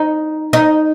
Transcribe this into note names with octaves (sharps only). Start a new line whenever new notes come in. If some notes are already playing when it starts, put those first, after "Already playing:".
Already playing: D#4
D#4